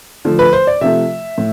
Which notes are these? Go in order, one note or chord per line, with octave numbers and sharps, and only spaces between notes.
D3 F3 A3
B4
C5
D5
C3 F3 A3 E5
A2